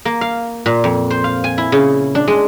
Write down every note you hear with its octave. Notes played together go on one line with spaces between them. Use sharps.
A#3
F5
A#2
F2
C5
F5
G#5
E4
C#3
D4
G#3